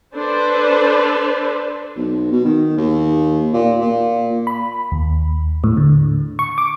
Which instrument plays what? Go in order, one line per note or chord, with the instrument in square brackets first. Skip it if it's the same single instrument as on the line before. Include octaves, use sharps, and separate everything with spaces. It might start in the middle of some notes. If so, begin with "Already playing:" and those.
[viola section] D4 A4 B4 C5
[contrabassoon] B1
B2
D#3
D#2
A#2
A#2
[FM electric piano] B5
D#2
A2
D3
C#6
D6